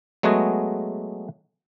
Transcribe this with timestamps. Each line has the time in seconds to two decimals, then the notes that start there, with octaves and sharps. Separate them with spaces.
0.23 F#3 G#3 A3 B3 F#4 G#4